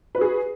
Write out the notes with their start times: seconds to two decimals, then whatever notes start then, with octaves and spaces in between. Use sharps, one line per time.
0.15 B4
0.18 F#4
0.21 G#4